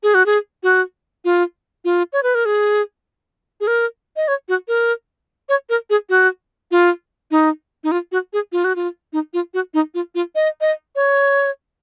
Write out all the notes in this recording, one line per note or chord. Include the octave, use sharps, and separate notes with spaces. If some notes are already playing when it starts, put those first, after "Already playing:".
G#4
F#4
G#4
F#4
F4
F4
C#5
B4
A#4
G#4
G#4
A#4
D#5
C#5
F#4
A#4
C#5
A#4
G#4
F#4
F4
D#4
D#4
F4
F#4
G#4
F4
F#4
F4
D#4
F4
F#4
D#4
F4
F4
D#5
D#5
C#5